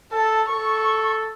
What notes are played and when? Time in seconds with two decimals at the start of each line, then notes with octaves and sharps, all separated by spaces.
0.12 A4 A5
0.49 A4 C#6